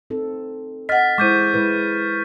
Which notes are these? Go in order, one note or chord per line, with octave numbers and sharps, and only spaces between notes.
C4 D#4 A4
D#5 F#5 F6 A6 B6
G#3 E4 C5 C#6 D6 G6 D#7
G#3 E4 B4